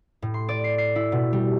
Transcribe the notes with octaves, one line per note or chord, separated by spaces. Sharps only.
A2
C6
D5
C7
C7
E4
B2
G3